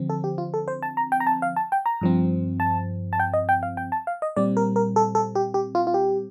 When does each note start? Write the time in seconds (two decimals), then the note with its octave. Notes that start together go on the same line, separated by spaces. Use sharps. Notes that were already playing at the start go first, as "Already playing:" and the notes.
Already playing: D3 F3 C4
0.10 A4
0.24 G4
0.38 F4
0.54 A4
0.68 C5
0.83 A5
0.97 A#5
1.12 G5
1.20 A#5
1.27 A5
1.42 F5
1.56 A5
1.72 G5
1.86 A#5
2.01 G2 F3 C4
2.60 A5
3.13 A5
3.20 G5
3.34 D#5
3.49 G5
3.63 F5
3.77 G5
3.92 A5
4.07 F5
4.22 D#5
4.36 A#2 G3 C4 D5
4.57 A#4
4.76 A#4
4.96 A4
5.15 A4
5.35 G4
5.54 G4
5.75 F4
5.87 F4
5.94 G4